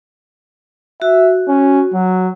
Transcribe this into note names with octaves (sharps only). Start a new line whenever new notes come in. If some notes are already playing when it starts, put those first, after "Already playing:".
F#4 E5
C#4
F#3